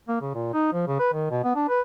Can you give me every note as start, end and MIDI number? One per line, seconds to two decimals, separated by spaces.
0.08 0.17 58
0.21 0.32 49
0.34 0.52 46
0.54 0.72 63
0.73 0.84 53
0.87 0.98 49
0.99 1.08 71
1.13 1.28 51
1.30 1.40 47
1.44 1.55 59
1.55 1.66 62
1.69 1.81 71